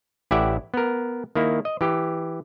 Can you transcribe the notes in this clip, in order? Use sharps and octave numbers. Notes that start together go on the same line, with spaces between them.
A1 E4 G4 D5 E5 F#5
B3 A#4
D#3 A#3 E4
D#5
E3 G4